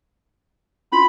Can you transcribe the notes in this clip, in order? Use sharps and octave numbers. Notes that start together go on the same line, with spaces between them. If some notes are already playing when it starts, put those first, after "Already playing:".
C#4 F4 B5 C6